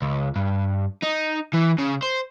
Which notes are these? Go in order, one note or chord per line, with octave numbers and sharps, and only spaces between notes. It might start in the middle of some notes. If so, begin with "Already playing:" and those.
C#2
G2
D#4
E3
C#3
C5